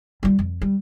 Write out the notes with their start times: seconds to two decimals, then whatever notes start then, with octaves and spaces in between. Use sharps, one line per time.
0.23 G3 F4
0.39 F2
0.62 G3